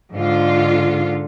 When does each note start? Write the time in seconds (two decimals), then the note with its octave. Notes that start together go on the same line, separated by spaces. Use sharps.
0.12 G#2 D3 F4